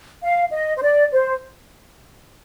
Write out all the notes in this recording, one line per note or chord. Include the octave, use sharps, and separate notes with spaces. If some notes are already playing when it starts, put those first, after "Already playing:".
F5
D#5
C5
D5
C5